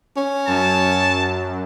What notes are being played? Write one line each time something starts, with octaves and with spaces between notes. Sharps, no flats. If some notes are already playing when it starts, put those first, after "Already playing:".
C#4
F#2 A5